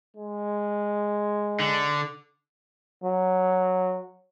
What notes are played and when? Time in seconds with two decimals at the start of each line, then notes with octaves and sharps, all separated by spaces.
0.17 G#3
1.60 D3
3.04 F#3